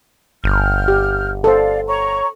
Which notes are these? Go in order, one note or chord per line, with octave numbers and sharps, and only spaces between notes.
G1 F6 G6
G4
A4 C5 D5 F5
C#5 A#5 C#6